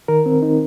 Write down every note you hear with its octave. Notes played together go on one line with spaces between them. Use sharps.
D#3 A#4
C4
D#4